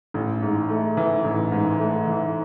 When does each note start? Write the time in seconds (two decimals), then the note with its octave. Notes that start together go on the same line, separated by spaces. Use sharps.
0.14 A1
0.42 G#2
0.69 A3
0.97 E3
1.24 A1
1.52 G#2
1.79 A3
2.07 E3